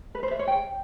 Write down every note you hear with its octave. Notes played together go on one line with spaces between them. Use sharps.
B4
C5
E5
C#5
G5